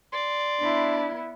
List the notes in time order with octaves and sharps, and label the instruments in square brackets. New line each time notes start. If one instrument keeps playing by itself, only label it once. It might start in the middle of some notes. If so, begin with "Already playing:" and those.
[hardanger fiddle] D5 [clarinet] C6
[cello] B3 E4 [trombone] D4